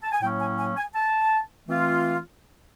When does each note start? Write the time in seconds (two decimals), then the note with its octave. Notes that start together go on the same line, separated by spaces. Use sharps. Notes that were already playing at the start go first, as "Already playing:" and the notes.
0.03 A5
0.12 G#5
0.21 A2 F#3 A#3 C#4 G5
0.40 G#5
0.58 G#5
0.77 G#5
0.94 A5
1.67 E3 A3 C4 F4